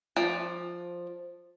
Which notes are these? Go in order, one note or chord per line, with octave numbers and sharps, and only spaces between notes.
F3 D5